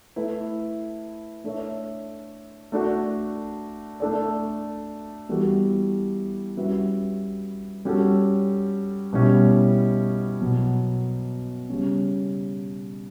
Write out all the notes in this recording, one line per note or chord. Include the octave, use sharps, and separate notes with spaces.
A3 E4 B4
A3 D4 A4 C#5 E5
A3 D4 F#4
A3 D4 A4 D5
E3 G3 B3 F#4 A4
G3 C#4 F#4 B4 E5
G3 C#4 F#4 A4
B2 G3 C#4 E4
B2 F#3 B3
C#3 G3 C#4